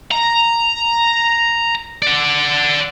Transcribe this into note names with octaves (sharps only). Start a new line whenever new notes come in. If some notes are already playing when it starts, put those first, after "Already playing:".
A#5
D5 F#5